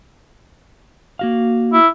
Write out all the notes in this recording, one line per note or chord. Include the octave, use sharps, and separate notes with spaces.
A#3 F#4 F5
E4